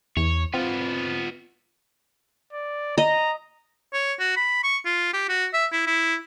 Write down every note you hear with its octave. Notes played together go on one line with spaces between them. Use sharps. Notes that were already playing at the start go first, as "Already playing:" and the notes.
E2 C#5
B3 C4 F4
D5
D#5 A#5
C#5
F#4
B5
C#6
F4
G4
F#4
E5
E4
E4